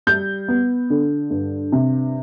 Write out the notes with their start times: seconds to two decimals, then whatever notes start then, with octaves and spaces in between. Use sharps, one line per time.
0.07 G3 G6
0.48 B3
0.90 D3
1.31 G2
1.72 C3